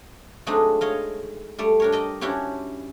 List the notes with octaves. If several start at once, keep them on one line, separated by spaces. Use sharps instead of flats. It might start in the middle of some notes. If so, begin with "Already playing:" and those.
F#3 G#3 A3 C4 D4 D#4
C#5 D#5 F5
G3 A3 D5
D4 A#4 C#5
D5 D#5 G5
C#4 D4 E4 F#4 G4 C#5